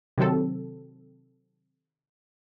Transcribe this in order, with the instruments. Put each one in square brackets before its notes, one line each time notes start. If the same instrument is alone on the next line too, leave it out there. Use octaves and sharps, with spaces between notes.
[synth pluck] C3 D#3 F#3 C4 A4